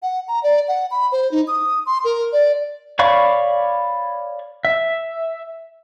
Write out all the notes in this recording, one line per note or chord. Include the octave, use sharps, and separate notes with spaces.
F#5
A#5
D5
F#5
B5
C5
D#4
D#6
C6
A#4
D5
C#5 D5 F5 B5 C#6
E5